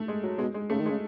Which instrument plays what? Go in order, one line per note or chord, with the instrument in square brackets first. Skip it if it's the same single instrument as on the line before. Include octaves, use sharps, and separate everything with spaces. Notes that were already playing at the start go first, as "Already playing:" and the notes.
Already playing: [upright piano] A3
G#3
F#3
[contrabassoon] B2 [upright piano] G#3
[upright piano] G#3
[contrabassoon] C#3 [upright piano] A3
[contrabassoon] D#3
[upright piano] G#3
[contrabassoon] C#3